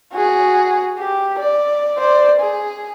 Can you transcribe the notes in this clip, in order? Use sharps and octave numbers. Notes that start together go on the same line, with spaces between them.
F#4 G#4
G4
D5
C5 D5
G#4